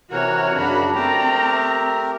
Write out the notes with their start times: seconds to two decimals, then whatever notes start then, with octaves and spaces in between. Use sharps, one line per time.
0.11 C3 E3 F#4 A#4 C#5 F#5
0.55 F#2 C#3 D4 F#4 B5
0.95 A3 C4 G4 A#4 D5 G5 A5 A#5
1.53 E5